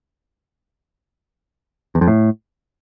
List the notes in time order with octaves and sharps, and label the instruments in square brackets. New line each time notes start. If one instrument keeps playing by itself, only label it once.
[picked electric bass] E2
F2
A2